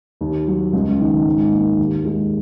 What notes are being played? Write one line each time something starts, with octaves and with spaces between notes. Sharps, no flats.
D#2
F#3
C#2
D#3
G#2
A#3
D#2
G#3